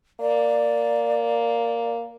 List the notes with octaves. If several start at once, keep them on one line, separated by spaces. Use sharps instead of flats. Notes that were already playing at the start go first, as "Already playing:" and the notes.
A#3 D5